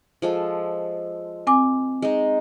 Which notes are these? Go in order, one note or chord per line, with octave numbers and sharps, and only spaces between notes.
F3 G#3 A4
C4 G#5 D6
G#3 D#4